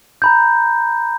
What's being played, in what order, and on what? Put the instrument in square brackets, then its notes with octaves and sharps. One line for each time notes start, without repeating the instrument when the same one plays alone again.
[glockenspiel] A#5 B5 G6